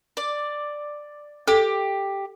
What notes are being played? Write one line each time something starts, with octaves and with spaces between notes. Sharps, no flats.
D5
G4 A4